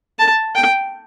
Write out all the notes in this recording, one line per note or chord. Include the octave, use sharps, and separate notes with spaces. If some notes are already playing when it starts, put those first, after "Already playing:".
A5
G5